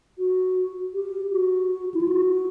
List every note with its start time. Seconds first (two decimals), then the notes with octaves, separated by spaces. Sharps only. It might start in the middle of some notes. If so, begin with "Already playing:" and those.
0.19 F#4
0.94 G4
1.32 F#4
1.94 E4
2.01 F4
2.08 F#4